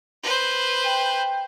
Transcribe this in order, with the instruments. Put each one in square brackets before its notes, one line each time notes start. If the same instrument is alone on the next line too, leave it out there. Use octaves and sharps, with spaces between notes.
[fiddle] B4 C5
[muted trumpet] G5